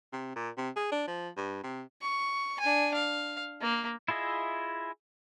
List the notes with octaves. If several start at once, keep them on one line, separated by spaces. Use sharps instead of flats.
C3
A#2
C3
G#4
D4
F3
G2
C3
C#6
D4 G#5
F5
A#3
E4 F4 G#4 D#5 E5